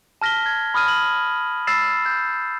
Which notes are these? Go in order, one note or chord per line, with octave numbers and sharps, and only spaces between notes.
A5 F6 A#6 B6 G7
G#6
B5 D#6 F6 D#7
F#7
B5 E6 A6 C7 E7
G6